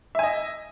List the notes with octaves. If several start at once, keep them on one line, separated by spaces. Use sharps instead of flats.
D#5 E5 G#5